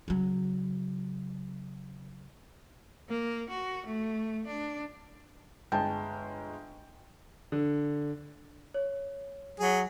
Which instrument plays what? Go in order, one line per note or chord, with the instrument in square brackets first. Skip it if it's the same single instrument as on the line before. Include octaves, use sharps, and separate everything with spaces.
[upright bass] C#3 F#3
[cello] A#3
F#4
A3
D4
[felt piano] G1 G#3 G6 [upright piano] G5 [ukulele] A5
[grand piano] D3
[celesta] C#5
[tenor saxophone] F#3 [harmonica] G#4